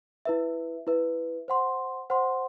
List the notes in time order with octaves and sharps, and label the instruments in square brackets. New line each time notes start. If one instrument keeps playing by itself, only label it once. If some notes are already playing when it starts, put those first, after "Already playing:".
[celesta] E4 B4 E5
E4 B4 E5
C5 F#5 C6
C5 F#5 C6